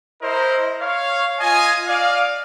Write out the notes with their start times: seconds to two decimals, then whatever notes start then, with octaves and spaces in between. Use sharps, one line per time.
0.22 E4 A#4 C5 D#5
0.81 C#5 F5
1.40 F4 D#5 G#5
1.87 D5 D#5 F5